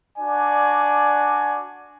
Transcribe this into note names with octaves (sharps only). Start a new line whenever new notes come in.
D4 F#4 D5 G#5